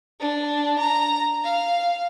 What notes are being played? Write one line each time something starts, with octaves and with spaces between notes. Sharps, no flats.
D4
A#5
F5